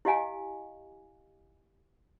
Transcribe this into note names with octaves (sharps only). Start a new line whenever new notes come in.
E4 G4 D#5 F5 G#5